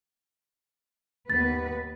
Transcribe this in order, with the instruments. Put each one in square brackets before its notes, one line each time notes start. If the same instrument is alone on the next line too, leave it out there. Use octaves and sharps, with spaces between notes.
[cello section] D#2 B3 B4 [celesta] A6